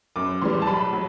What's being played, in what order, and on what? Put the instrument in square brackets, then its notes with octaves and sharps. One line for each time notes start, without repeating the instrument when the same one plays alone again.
[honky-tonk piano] F#2 D6
E3 G3 C6
A5
B1 B5
F#3